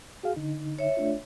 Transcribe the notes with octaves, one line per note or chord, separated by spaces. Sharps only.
F#4 G#4 F5
D3 D#4
C#5 E5
A3 D4 F4